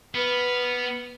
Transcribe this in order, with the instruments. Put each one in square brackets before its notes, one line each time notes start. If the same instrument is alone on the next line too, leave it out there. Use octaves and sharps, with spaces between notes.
[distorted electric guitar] B3 [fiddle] B4 F6